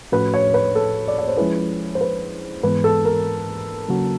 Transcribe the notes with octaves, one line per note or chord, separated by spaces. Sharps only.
A2 F3 A3 C#4 F#4 B4
C#5
B4
A4
D5
C#5
C5
F3 G#3 C#4 E4 G#4 B4
C5
B4
G#2 E3 G#3 B3 B4
A4
A#4
C#3 F#3 A#3 C#4 F#4